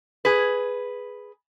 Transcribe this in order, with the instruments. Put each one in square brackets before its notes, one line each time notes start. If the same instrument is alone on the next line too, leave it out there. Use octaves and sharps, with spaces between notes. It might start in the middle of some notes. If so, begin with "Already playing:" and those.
[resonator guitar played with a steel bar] G#4 B4